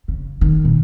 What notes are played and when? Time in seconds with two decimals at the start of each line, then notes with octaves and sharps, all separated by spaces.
0.08 C#3
0.41 D#3
0.65 A#2